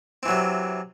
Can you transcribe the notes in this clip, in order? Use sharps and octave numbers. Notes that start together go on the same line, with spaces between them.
C3 E3 F#3 C4